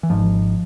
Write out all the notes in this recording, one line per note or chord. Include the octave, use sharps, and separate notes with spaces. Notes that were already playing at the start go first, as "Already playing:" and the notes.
E3
G#1 G#2 F3